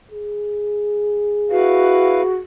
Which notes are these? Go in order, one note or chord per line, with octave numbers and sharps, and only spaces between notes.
G#4
E4 F#4 B4 F5